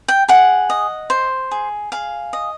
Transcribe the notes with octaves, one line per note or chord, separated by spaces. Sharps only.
G5
G#4 F#5
D#5
C5
G#4
G#4 F5
D#5